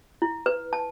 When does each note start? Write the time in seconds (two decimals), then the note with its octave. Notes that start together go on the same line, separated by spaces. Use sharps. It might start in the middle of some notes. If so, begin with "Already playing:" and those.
0.22 E4
0.46 B4
0.73 A5